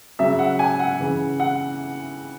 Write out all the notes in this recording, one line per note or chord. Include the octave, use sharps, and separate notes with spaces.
C#3 F#3 E5
F#5
G#5
F#5
C#3 E3
F#5